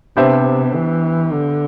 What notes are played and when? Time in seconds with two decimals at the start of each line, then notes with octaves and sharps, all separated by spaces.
0.17 C3 B3 D4 G4 C5 E5
0.75 E3
1.32 D3